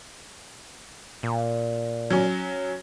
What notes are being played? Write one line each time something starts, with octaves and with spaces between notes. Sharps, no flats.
A#2
F#3 C#4